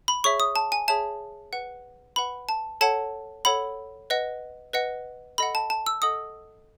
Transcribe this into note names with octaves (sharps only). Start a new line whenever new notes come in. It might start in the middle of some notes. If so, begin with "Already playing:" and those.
B5
G#4 C#5 E5 C#6
D#6
A5
G#5
G#4 C#5 E5 A5
B4 F#5
B4 F#5 B5
A5
A4 C#5 F#5 A5
A4 C#5 F#5 B5
B4 D#5 F#5
B4 D#5 F#5
A4 D#5 F#5 B5
A5
A5
E6
A4 D#5 F#5 D#6